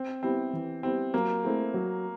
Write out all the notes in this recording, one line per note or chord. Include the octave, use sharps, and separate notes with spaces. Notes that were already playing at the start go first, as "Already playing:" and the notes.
Already playing: C4
G3 B3 C4 E4 G4
E3
G3 B3 C4 E4 G4
F#3 A#3
A3 C4 E4 G#4
F#3